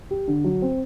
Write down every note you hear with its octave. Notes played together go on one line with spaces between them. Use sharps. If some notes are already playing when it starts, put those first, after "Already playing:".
G4
D3
F#3
C4